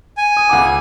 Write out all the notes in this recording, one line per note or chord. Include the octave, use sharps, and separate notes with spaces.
G#5
D#6
C#2 F#5 D6